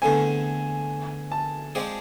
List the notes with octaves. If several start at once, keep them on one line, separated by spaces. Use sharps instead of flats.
E2 D3 A3 C4 G#5
A5
F3 G#3 C4 G#4 D5